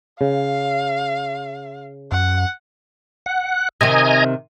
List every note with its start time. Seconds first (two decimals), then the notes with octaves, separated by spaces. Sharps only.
0.21 C#3 F5
2.12 F#2 F#5
3.26 F#5
3.81 C3 D#3 D#5 G#5 A#5